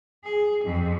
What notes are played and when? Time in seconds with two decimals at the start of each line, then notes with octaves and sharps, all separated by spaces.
0.24 G#4
0.64 F2